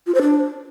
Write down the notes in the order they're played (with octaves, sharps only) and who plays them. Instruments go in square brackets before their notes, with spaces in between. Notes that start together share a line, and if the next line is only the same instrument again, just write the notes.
[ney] F4
C5
D4